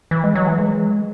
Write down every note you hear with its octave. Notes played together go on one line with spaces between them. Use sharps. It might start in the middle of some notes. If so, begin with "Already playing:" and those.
E3
G#3
F#3
E3
G#3